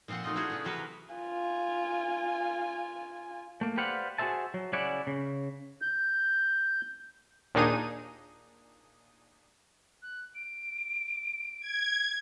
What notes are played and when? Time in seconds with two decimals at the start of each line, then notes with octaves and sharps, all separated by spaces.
0.08 A#2 F3 C4 C5 F#5
0.24 F#3 A3 D#4 F4 D#5
0.35 A3 C#4 D4 E4 F#4 G#4
0.50 C#3 B3 C#4
0.64 C3 E3 F#3 F#4 A#4 B4
1.15 F4 G#5
3.61 A3 A#3
3.77 G4 B4 C5 D5 F5 F#5
4.18 F#4 G#4 A#4 C5 E5 A5
4.54 F#3
4.73 C#3 C#4 E4 D5 F#5
5.07 C#3
5.82 G6
7.55 D#2 A#2 D4 D#4 G#4 D#7
10.02 F#6
10.35 D7
11.60 G#6